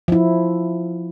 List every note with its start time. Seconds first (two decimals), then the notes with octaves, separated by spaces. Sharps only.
0.08 F3 E4